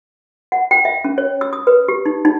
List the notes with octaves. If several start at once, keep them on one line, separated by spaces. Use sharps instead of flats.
F#5
G5
E5
C#4
C#5
E6
D#6
B4
G4
D#4
D#4